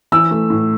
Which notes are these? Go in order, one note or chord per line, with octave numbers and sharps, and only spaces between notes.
E3 E6
A3
A2